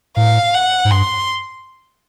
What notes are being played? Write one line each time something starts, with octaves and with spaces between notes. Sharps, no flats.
A2 F5
F#5
G#2
G2 C6